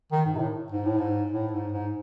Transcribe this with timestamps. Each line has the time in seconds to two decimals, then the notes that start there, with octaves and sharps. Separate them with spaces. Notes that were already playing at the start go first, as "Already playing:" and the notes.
0.12 D#3
0.25 G#2
0.35 C3
0.39 A2
0.72 G#2
0.85 A2
0.98 G#2
1.32 A2
1.53 G#2
1.72 G#2